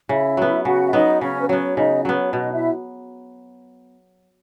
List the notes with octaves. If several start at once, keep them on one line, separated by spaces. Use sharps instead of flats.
C#3 E4 E5
F#3 B3
C#3 F#4 F#5
E5
F#3 B3 D#4 D#5
C#3 C#4 C#5
B4
F#3 B3 C#4 C#5
C#3 D#4 D#5
F#3 B3 C#4 C#5
B2 D#4 D#5
E4 E5